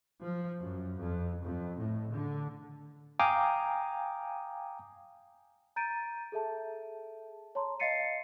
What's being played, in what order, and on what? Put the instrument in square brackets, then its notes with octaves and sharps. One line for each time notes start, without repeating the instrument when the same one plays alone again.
[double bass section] F3
F#2
F2
F2
A2
D3
[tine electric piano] F5 G5 G#5 A#5 D6 D#6
[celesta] A#5 G6 A6 D7 D#7
G#4 A4 E5 A5
C#5 A5 A#5 C6
D#5 F5 A6 C7 C#7 D#7